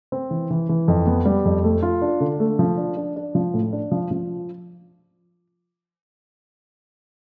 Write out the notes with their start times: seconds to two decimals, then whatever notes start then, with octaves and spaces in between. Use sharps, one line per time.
0.12 C4
0.31 E3
0.50 E3
0.69 E3
0.88 F2
1.07 B3
1.25 G3
1.45 F2
1.64 A3
1.83 F4
2.02 D4
2.20 D3
2.40 A3
2.59 F3
2.77 D4
2.97 D4
3.16 D4
3.35 F3
3.54 A2
3.73 D4
3.91 F3
4.11 F3